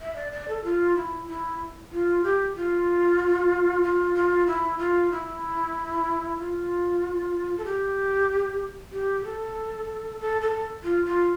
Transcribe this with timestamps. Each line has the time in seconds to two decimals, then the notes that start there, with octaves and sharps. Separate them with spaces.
0.01 E5
0.16 D5
0.32 D5
0.48 A4
0.64 F4
0.96 E4
1.28 E4
1.92 F4
2.24 G4
2.56 F4
3.83 F4
4.15 F4
4.47 E4
4.78 F4
5.11 E4
6.38 F4
7.57 A4
7.65 G4
8.92 G4
9.25 A4
10.20 A4
10.41 A4
10.84 F4
11.05 F4